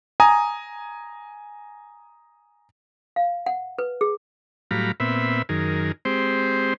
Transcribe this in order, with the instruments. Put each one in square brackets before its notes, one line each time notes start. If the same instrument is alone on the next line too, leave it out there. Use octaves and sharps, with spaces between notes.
[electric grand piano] G#5 A#5 D#6
[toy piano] F5
F#5
B4
G#4
[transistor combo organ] A2 F#3 G3 F5 A#5 B5
A#2 B3 C4 E5 B5
F#2 D#3 G#4 A#4
G#3 C4 G4 C5